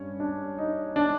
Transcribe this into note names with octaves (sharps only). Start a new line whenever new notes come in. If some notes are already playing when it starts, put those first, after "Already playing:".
Already playing: G2 C#4
D4
D#4
D4